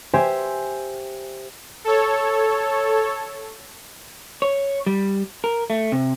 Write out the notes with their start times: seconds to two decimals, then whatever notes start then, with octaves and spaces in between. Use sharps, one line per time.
0.13 G4 C5 E5 G#5
1.84 A4 C#5
4.42 C#5
4.86 G3
5.44 A#4
5.70 A3
5.92 C3